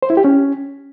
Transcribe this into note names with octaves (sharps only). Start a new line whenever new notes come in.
C5
E4
G4
C#4